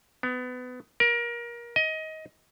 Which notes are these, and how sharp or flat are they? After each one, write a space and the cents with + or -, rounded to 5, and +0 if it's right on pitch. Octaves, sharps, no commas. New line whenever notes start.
B3 +25
A#4 +25
D#5 +20